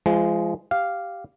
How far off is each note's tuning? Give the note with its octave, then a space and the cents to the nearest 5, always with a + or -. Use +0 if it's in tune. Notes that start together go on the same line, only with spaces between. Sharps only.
F3 -30 G#3 +0
G4 +0 F5 +0